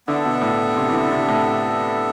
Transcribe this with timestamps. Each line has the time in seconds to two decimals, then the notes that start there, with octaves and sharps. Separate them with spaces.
0.07 D3 B3 D4 A4 E5
0.25 B2
0.41 A2
0.76 C3
0.89 E3
0.94 D3
1.11 C3
1.28 A2